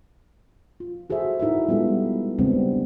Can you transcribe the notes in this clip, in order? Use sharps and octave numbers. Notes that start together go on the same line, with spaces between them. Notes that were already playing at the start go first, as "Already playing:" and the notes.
F4
F#4 G#4 A4 C5 E5
D#4 E4 F#4 A#4 E5
G3 G#3 B3 F4 A4
C#3 G3 G#3 B3 C4 D4